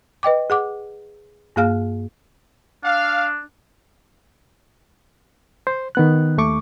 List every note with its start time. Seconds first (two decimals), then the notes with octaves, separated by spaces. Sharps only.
0.23 B4 D#5 G5 D6
0.50 G#4 F#5 D6
1.56 G2 A#3 G#4 F5 F6
2.84 D4 F5
5.67 C5
5.95 D#3 B3 F#6
6.38 D#2 A3 C#6 D6